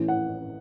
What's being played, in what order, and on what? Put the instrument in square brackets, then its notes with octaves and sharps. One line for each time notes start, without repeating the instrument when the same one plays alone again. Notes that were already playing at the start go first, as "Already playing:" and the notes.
Already playing: [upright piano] A1 A2 E3
F#5